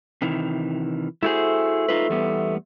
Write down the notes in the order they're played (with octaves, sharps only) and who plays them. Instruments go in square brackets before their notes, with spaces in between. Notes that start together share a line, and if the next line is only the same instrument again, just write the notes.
[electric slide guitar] C3 D#3 E3
[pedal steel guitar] A3 C5 [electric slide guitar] E4 F#4 G#4
[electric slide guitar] D#4 F4 B4
E2 G3 B3